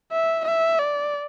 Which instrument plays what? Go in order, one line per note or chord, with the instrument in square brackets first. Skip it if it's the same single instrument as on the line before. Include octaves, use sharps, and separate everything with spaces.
[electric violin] E5
E5
D5